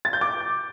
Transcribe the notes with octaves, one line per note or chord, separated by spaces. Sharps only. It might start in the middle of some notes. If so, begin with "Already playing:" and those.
A6
G6
D6